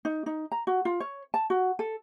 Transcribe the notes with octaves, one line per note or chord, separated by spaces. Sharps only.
D#4
D#4
A#5
F#4
F4
C#5
A5
F#4
A4